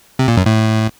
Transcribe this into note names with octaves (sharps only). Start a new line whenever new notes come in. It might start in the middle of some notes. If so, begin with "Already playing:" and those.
C3
A#2
F#2
A2